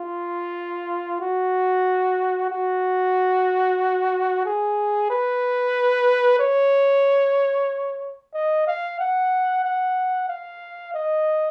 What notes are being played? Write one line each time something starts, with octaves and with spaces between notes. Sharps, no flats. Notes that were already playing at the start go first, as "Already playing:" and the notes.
Already playing: F4
F#4
F#4
G#4
B4
C#5
D#5
F5
F#5
F#5
F5
D#5